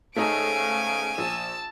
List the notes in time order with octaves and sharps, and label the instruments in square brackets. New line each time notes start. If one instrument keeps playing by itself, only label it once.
[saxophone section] G#2 C#3 [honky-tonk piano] A3 D#4 A4 [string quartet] G#5 [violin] D7
[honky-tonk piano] A#1 [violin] A5 E6